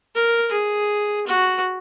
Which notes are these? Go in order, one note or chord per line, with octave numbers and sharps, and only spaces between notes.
A#4
G#4
F#4